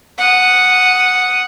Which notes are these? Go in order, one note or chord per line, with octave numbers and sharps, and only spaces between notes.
F#5 D#6